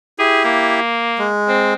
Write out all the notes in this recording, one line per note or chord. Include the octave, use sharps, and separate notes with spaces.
E4 G4 G#4
A#3
G#3
C4